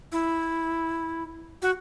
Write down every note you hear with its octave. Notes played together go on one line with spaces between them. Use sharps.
E4
F#4